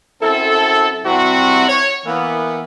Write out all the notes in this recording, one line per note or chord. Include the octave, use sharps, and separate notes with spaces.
F#2 C4 E4 A4
C3 G3 C4 E4 F#4
C#5
E3 A#3 B3